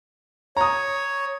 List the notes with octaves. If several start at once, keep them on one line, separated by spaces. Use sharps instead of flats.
C#5 A#5 D#6